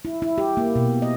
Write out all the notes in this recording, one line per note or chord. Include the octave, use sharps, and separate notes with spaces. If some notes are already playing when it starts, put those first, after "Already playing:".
E4
E4
G4
A#3
B2
D#5